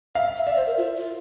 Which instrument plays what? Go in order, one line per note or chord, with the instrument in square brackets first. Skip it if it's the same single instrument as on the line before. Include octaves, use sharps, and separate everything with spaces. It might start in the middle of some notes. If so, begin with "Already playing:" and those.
[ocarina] E5 [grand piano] F5
[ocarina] E5
[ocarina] D5 [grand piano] E5
[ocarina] C5
A#4
F4
F4